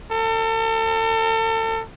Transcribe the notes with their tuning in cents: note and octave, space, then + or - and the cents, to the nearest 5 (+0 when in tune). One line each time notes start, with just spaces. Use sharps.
A4 +35